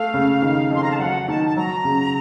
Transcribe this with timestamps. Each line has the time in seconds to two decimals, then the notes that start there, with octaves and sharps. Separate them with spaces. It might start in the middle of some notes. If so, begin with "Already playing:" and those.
Already playing: A3 F5
0.14 C#3
0.42 D#3
0.70 F2 C6
0.83 A#5
0.91 A5
0.99 F#3 F#5
1.23 F#5
1.28 D#3 A5
1.45 A5
1.57 F#3 A#5
1.84 C#3